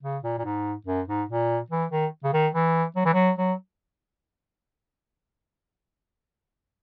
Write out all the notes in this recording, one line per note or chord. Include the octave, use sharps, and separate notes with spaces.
C#3
A#2
A#2
G#2
F#2
G#2
A#2
E3
D#3
C#3
D#3
E3
F#3
E3
F#3
F#3